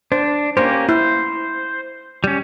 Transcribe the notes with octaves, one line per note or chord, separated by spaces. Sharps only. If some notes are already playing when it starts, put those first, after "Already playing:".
D4 C5
A#3 C#4 G4 C5
E4 C5
G3 C#4